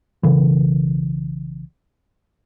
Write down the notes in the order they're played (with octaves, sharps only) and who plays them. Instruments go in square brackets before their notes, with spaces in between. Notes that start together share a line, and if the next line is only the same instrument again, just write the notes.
[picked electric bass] B1 C#3 E3